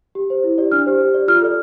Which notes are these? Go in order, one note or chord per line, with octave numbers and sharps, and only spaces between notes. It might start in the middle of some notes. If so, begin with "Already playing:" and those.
G4
C5
E4
G4 D5
D4 F6
G4 C5
G4
D5
F4 F6
A4 D5